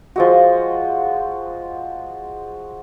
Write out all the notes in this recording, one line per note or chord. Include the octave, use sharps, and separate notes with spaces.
F3 G#3 F#4